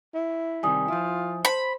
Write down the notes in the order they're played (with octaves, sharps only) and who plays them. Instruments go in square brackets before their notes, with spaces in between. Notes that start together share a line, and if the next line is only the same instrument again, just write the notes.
[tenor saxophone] E4
[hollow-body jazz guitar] C3 D#3 G3 [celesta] G#5 D#6
[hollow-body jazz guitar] F3 E4 [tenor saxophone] F4
[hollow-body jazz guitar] C5 [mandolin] B5